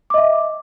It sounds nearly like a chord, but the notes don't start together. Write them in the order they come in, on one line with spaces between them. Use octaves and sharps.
D6 D#5 E5